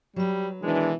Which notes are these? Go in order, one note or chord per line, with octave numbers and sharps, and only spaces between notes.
F#3 G3 B4
B2 D#3 E3 G#3 D4